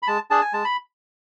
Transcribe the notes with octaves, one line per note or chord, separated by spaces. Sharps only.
B5
G#3 A5
D4 G#4 A5
G#5
G#3 A5
B5